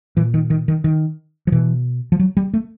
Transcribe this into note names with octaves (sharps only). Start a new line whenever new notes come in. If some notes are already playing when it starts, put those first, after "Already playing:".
A#2 E3
D#3
D#3
D#3
D#3
F3
B2 E3
F3
F#3
G3
A3